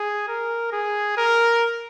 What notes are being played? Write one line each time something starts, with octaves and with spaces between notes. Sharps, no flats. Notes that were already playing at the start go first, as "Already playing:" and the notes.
Already playing: G#4
A#4
G#4
A#4